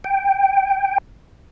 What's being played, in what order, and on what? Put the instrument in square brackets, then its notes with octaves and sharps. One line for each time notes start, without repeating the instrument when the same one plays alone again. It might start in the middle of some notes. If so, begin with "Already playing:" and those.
[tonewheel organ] G5